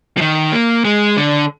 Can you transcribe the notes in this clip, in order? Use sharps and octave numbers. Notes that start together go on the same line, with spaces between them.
F3
D#3
A#3
G#3
D3